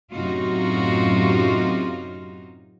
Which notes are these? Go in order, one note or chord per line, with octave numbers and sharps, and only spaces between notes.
F#2 A2 C3 D#4 F4 F#4